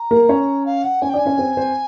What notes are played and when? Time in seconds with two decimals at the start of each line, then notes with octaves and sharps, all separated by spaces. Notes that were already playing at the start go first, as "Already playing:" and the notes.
Already playing: A#5
0.11 A#3 A#4
0.29 C#4 C#5
0.66 F5
0.84 F#5
1.02 C#4 C#5 G#5
1.09 G5
1.14 D4 D5
1.18 G#5
1.26 C#4 C#5
1.38 C4 C5
1.57 C4 C5